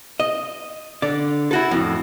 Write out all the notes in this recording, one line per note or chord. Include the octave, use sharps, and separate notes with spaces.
D#5
D3 D5
E4 F#4 A4
F2 A2